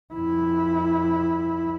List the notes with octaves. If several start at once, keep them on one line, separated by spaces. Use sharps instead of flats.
F2 E4